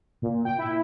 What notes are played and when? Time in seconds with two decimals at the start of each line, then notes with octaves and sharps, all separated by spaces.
0.22 A#2
0.45 G5
0.58 E4